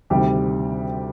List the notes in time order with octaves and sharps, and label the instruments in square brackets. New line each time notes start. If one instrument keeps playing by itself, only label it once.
[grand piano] D2 C3 D#3 G3 G4